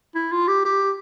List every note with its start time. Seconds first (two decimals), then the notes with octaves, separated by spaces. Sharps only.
0.15 E4
0.32 F4
0.48 G4
0.65 G4